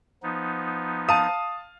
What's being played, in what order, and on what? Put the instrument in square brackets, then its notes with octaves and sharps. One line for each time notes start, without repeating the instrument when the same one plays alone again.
[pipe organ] F3 B3 D#4
[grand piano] F5 [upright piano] A5 D#7 [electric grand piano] D#6